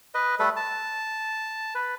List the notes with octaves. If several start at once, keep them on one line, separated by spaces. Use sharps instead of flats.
B4 D#5
G3 A3 A4 B4
A5
B4